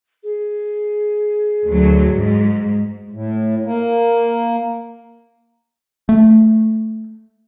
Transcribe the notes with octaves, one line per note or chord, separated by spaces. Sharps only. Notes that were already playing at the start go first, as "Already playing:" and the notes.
G#4
D2 F#3
G#2
A2
A#3
A3